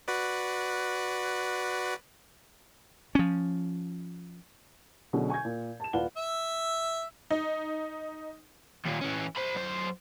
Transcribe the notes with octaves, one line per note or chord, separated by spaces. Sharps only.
F#4 B4 D5
F3 C#4
B2 D3 F#3 C#4 G#4
G#5 C#6 G6 G#6
A#2
A5 E7
D#1 F4 B4 D5 F#5 G7
E5
D#4
D#2 A#2
E3 C#4
C5 B5
F#2 C5